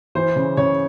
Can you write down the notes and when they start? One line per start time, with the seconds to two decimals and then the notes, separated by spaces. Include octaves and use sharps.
0.15 E3 C5
0.36 C#3
0.57 C#3 C#5